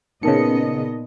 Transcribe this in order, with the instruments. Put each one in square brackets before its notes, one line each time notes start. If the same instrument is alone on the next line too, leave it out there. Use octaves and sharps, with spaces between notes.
[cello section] A#2 B3 D#5 [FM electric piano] C#3 C#7 [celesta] D#4 A#4 A5